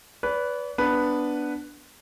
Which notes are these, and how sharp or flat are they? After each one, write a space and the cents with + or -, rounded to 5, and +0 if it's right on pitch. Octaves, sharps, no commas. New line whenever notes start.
B4 +0 D5 -40
B3 +0 D4 +0 B4 +0